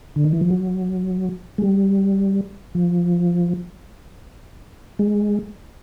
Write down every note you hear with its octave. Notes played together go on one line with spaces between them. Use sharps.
D3
D#3
E3
F3
F#3
G#3
G3
F3
G#3